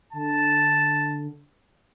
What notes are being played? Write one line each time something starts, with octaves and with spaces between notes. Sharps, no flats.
D3 A5